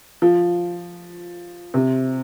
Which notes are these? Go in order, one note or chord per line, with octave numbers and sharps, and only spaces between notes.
F3
C3